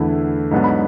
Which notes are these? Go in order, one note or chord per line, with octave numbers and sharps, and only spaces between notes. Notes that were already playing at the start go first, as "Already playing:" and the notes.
Already playing: E2 D3 A3 E4
G#2 F#3 B3 D4
B5